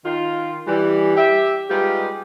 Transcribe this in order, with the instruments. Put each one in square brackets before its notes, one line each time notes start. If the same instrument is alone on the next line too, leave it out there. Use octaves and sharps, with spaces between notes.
[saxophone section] D#3 F4
E3 G3
G4 E5
G3 G#3 B3 D#4 F4 G4